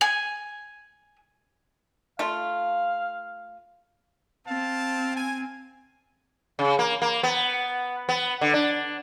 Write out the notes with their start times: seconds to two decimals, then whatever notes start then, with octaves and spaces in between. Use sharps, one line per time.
0.01 G#5
2.19 A3 F4 F5
4.47 C4 F5 A5
5.16 G#5
6.59 C#3
6.79 A#3
7.02 A#3
7.23 B3
8.09 B3
8.41 D3
8.54 D4